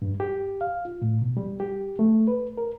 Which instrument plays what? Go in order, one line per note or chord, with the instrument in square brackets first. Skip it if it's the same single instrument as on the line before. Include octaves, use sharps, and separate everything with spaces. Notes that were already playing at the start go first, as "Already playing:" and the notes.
[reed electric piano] G2
G4
F5
F4
A2
B2
G3
G4
A3
B4
A#4